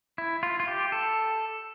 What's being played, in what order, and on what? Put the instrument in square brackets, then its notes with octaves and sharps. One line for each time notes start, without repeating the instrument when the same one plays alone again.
[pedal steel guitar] E4
F4
F4
G4
A4